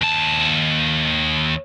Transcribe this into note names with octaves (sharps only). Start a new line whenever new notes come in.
D#2 A5